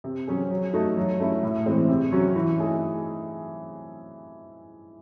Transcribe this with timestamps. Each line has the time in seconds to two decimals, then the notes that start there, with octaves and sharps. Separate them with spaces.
0.04 C3
0.28 F#3 C#4 G#4
0.51 F#3
0.73 A3 D#4 F#4 A4
0.97 F#3
1.20 A3 C#4 E4
1.43 A2
1.66 E3 G#3 C4
1.88 C3
2.12 F#3 C#4 F#4 C#5
2.36 E3
2.58 A3 D#4 G#4